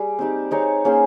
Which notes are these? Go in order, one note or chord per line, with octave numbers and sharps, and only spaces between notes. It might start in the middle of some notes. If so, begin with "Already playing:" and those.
Already playing: G3 G#4
C4 D#4 G4
C4 D#4 G#4 C#5
A#3 C#4 G#4 C5